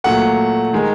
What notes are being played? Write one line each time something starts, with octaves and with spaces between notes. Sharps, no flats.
A#2 F#3 A3 F#5
D#3 G#3